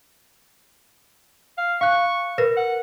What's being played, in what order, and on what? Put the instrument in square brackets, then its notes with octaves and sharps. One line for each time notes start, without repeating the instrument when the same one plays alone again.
[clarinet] F5
[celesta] F5 F#6 [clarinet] C#6
[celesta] A#4 B4 A#6
[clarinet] F#5